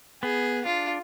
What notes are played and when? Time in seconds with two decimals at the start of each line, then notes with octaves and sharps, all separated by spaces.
0.23 B3 G#4
0.65 D4 F4